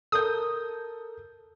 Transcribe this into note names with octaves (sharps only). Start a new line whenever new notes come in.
A4 A#4 D#6 G6